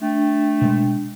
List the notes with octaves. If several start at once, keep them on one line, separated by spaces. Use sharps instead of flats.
A3 D4 G5
B2 G#3